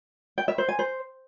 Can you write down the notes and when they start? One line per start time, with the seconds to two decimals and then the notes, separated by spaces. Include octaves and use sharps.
0.38 G5
0.48 E5
0.58 C5
0.69 G#5
0.79 C5